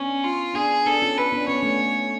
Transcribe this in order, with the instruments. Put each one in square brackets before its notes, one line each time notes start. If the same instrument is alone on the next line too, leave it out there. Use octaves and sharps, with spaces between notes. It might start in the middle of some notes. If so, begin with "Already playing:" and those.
Already playing: [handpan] B3 D4 [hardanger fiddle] C#4
[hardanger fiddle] F4
[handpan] B3 D4 [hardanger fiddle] G#4
[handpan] B3 D4 [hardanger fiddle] A4
[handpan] C#4 F4
[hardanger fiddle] B4
[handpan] B3 D4
[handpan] C#4 [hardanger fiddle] C#5
[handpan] B3
A3 C#4